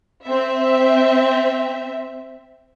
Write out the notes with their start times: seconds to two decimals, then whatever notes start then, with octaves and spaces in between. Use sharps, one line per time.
0.24 C4 E5